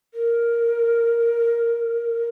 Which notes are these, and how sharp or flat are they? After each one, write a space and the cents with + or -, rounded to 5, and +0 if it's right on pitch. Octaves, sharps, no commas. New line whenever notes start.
A#4 +0